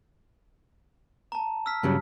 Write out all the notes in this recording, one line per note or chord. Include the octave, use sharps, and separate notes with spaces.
A5 A#5
E6 F6 B6
G2 C#3 F#3